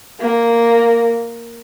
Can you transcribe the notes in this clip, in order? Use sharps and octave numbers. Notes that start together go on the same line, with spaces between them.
A#3